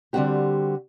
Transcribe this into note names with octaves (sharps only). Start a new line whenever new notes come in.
D3 G3 A#3 C4 F#4 G4